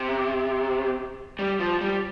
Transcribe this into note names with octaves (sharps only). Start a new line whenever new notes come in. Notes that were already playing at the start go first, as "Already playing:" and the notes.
Already playing: C3
G3
F3
G3